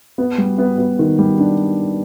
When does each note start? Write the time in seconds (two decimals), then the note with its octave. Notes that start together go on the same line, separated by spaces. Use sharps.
0.18 B3
0.38 G3
0.58 B3
0.78 B3
0.99 D#3
1.19 G3
1.39 D4